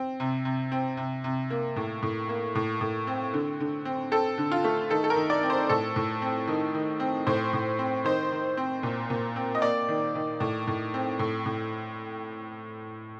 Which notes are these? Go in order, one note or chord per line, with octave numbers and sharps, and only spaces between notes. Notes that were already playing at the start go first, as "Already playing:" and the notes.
Already playing: C4
C3
C3
C4
C3
C3
A#3
A2
A2
A#3
A2
A2
C4
D3
D3
C4
C4 A4
D3
F4
A3
D#3 A4
A4
A#4
D#3
D5
C4
C5
A2 A4
A2
C4
D#3
D#3
C4
A2 C5
A2
C4
D#3 C5
D#3
C4
A#2
A#2
C4
D#5
A#3 D5
D#3
D#3
A2
A2
C4
A2
A2